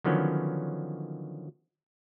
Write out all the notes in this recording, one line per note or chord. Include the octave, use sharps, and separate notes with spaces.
D3 D#3 F3 F#3 B3 C#4